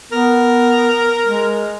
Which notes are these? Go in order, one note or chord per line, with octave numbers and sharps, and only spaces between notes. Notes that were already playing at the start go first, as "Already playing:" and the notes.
B3 A#4
G#3